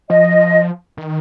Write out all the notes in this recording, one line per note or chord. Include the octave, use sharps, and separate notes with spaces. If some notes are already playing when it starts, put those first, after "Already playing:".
F3 D#5
D#3